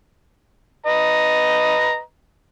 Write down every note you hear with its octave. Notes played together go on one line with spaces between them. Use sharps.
B4 D#5 A#5